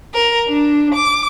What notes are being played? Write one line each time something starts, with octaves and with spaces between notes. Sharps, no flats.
A#4
D4
D6